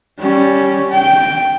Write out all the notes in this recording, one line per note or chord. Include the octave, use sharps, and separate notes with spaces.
G3 C#4
G5